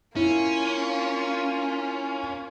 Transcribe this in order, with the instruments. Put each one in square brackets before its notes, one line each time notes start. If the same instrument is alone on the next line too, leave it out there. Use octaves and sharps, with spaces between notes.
[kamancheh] A#3 F4 [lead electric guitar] C#4 [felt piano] E4